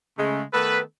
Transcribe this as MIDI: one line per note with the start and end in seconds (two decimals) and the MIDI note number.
0.18 0.42 49
0.18 0.42 56
0.18 0.42 57
0.53 0.80 51
0.53 0.80 57
0.53 0.80 59
0.53 0.80 69
0.53 0.80 71